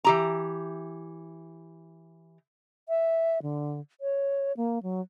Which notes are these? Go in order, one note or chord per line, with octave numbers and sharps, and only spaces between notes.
E3 G4 A#5
E5
D3
C#5
A#3
F#3